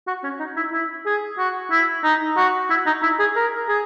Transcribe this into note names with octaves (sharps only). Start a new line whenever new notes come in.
F#4
C#4
D#4
E4
E4
G#4
F#4
E4
D#4
F#4
E4
D#4
E4
G#4
A#4
G#4